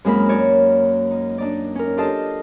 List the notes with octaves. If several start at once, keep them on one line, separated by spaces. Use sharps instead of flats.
F#2 G#3 A#3 C4 A#4 B5
F#4 C#5 D5
D#4
D4 D#4 D5
C#4 A#4
D4 F4 G4 A4 D#5 A5